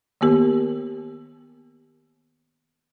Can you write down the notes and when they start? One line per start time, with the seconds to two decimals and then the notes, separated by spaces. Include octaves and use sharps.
0.21 D#3 A#3 B3 G4 A#4